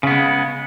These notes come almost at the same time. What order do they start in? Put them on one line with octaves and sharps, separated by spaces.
C#3 B3 G#3